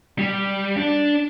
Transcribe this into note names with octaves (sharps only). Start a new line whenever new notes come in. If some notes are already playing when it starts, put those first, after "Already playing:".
G3
D4